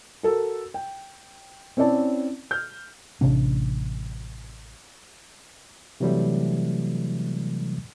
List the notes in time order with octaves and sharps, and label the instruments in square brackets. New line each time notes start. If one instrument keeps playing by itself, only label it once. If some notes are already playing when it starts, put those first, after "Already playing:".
[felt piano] F#4 A4 A#4
G5
C4 C#4 E4 D5 A5
F6 G6
[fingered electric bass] A1 C3 C#4 D4
[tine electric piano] C3 E3 F#3 G3 A3